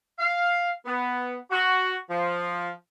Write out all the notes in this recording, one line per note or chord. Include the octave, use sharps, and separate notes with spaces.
F5
B3
F#4
F3